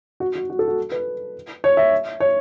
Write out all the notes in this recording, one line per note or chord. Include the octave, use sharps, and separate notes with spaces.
F#4
F#4
F#4
A4
F#4
B4
C#5
E5
C#5